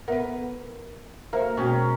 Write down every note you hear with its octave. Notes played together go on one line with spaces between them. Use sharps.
B3 A#4 B4 E5 F#5
A#3 F#4 A#4 C5 E5 F5
B2 G#3 C#4 F#4 G5